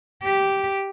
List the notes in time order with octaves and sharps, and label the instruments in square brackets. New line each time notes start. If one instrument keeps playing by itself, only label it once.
[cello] G4